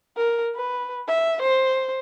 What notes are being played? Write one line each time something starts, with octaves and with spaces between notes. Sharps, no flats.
A#4
B4
E5
C5